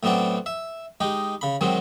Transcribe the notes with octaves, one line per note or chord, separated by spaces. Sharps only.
A2 F#3 B3 C4 D5
E5
G#3 D#4 G4
C#3 B5
D#3 F#3 G#3 C4